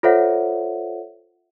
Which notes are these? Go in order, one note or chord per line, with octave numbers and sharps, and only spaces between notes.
F4 A4 C5 C#5 E5 F#5